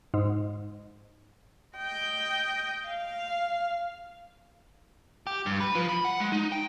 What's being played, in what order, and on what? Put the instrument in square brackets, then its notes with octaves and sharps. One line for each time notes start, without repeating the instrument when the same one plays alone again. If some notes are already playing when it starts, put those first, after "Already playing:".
[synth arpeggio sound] G#2
[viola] D#5 G5
F5
[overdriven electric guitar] G4
G2
B4
F3
B5
F#5
G#3
D#4
G5